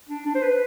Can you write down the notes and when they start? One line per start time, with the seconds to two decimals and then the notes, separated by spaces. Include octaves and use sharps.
0.09 D4
0.26 D4
0.35 C5
0.42 B4